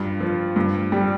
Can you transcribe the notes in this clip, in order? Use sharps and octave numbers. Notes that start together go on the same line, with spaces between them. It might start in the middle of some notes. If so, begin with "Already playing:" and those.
Already playing: G2 F4
F3
G2
G3